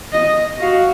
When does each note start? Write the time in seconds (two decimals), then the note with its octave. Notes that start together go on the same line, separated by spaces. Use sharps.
0.12 D#5
0.60 F#4 F5